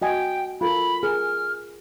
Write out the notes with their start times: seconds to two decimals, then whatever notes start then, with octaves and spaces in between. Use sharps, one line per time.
0.02 F#4 D#5 G5 G#5
0.61 F4 A4 A#4 B5
1.03 G#4 A#4 F6